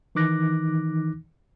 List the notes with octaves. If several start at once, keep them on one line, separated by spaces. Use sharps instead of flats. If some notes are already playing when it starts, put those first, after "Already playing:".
D#3 E3 D#4 D6 F#6 A#6